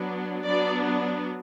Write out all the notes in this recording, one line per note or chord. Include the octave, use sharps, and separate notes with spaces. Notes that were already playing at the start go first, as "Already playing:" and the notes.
Already playing: F#3 B3 D4
F#3 B3 D4 D5